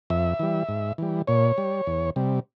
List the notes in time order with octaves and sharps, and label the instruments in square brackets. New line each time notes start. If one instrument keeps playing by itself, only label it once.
[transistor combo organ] F2 E5
E3 G3
G#2
E3 G3
A#2 C#5
G3
E2
C3 G3